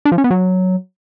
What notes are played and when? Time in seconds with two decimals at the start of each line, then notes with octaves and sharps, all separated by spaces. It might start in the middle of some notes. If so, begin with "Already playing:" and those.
0.05 D4
0.12 F3
0.18 C#4
0.24 B3
0.31 F#3